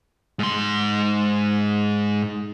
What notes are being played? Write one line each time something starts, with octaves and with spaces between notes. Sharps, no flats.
G#2 C6